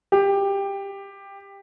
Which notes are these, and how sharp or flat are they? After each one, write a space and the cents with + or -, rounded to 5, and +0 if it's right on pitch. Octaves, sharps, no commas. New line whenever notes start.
G4 +15